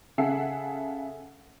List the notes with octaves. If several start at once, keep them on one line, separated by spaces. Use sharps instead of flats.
C#3 A4 E5 F#5 G#5 C7